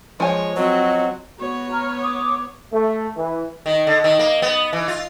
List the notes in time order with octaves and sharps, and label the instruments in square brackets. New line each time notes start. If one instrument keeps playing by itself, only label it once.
[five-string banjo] F3 G#5 [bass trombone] G#3 [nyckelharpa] C#5
[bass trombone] F#3 [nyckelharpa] C4 F#4 [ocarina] D#5
[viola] B3 C#5 [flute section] F#4
[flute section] A#5 F6
D6 D#6
[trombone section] A3
E3
[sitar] D#3
D3
D#3
A#3
B3
E3
F4